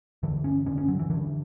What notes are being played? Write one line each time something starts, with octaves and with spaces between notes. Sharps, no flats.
G2 D3 E3
C#4
G2 D3 C#4
C#4
F#3
E3
G2 D3 E3